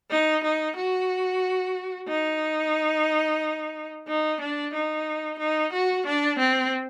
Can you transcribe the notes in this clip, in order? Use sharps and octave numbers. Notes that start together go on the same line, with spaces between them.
D#4
D#4
F#4
D#4
D#4
D4
D#4
D#4
F#4
D4
C4